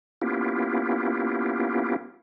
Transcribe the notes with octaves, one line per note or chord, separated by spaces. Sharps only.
A#3 B3 C#4 E4 F4 G4